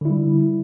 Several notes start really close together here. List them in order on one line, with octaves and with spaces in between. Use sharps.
D3 E4 G3